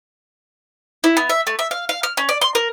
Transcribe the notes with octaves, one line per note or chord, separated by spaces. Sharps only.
E4
B3
E5
A3
E5
F5
F5
F6
C#4
D5
C6
A#4